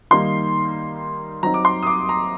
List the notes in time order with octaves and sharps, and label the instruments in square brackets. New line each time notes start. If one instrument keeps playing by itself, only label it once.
[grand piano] D#3 G3 A#3 D#4 C6
F#3 C4 D#4 A#5
D6
C6
D#6
D6
A#5